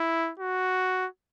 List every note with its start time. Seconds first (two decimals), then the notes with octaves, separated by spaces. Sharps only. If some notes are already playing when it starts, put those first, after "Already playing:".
Already playing: E4
0.39 F#4